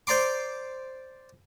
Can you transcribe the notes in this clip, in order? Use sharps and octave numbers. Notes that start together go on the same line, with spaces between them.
C5 D5 A#5 C6 D6